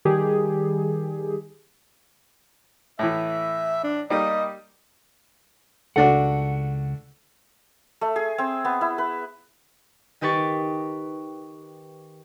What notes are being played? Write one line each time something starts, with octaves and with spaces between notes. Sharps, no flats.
D#3 G3 G4 G#4
A2 E3 E5
D4
G3 A#3 D#4 D#5
C#2 A3 D4 F#4 F#5
A3
G#4
C4
B3
E4
B4
D#3 D#4 G4 B4 C#6 A6